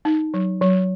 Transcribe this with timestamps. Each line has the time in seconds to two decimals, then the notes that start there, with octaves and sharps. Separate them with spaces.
0.05 D#4
0.34 F#3
0.61 F#3